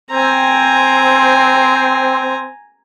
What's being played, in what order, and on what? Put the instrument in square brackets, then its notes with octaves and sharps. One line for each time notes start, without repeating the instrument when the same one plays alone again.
[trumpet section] C4 [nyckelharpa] G#5 A#5